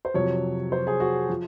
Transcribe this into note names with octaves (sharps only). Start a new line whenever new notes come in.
C5
F2 C3 F#3 C#5
C5
G#4
F#4
F3